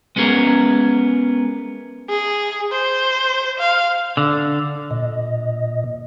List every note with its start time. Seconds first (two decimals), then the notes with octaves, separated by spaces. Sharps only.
0.16 G#3 B3 C#4 G#4 A#4
2.10 G#4
2.72 C5
3.59 F5
4.17 D3
4.91 A#2 D#5